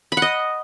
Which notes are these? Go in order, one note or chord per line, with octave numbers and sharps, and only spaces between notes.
B5
F#5
D#5